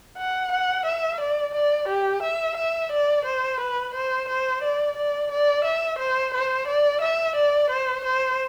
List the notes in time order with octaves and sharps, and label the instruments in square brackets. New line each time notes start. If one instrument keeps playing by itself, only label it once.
[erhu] F#5
F#5
E5
D5
D5
G4
E5
E5
D5
C5
B4
C5
C5
D5
D5
D5
E5
C5
C5
D5
E5
D5
C5
C5